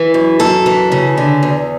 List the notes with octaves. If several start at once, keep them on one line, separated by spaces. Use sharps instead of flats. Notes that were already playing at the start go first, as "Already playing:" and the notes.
Already playing: E3
F#2
F#2 A4
E3
C#3
D3
E2